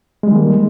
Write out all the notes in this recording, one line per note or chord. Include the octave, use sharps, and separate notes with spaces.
D#3 G3 G#3 A#3